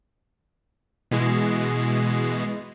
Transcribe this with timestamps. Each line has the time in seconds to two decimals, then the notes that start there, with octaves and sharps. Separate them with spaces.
1.11 B2 E3 G#3